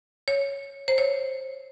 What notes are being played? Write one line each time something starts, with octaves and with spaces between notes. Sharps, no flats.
C#5
C5
C#5